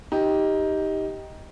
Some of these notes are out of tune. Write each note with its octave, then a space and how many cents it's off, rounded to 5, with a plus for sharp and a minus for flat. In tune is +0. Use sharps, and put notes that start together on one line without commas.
D#4 +10 G4 +0